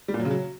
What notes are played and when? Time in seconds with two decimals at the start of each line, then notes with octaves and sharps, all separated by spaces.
0.08 G3
0.14 A#2
0.20 F#3
0.25 C#3
0.31 F#3